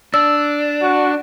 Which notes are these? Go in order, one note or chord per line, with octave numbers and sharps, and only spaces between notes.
D4 E6
F#4